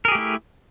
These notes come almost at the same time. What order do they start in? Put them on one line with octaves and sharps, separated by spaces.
A#4 G#4 G4 A3 E4